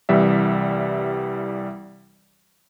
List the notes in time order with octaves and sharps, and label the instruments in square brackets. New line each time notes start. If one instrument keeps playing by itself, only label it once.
[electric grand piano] C2 E3 G3 E5